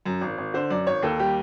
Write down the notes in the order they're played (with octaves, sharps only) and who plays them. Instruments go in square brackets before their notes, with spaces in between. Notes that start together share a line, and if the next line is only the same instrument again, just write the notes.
[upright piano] F#2
G#1
G#1
D3 C5
F#2 D5
G#1 C#5
D#2 A4
G3 G4